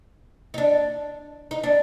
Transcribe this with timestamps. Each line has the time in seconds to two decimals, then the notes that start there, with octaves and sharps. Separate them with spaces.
0.54 D#4
0.58 D4
1.51 D#4
1.63 D4